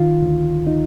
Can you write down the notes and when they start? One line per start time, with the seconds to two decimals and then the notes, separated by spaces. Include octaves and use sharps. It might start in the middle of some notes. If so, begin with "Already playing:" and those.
Already playing: D#3 F4
0.22 D2
0.67 D#4